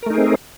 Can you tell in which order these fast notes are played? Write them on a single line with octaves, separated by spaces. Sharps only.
A#4 A3 D#4 G#4 C4